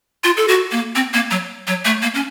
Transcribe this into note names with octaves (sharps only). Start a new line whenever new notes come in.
F4
A4
F#4
A#3
C4
A#3
F#3
F#3
A3
A#3
C#4